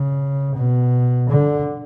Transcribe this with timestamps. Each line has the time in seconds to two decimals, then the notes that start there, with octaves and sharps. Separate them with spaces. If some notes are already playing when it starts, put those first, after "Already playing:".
Already playing: C#3
0.56 B2
1.29 D3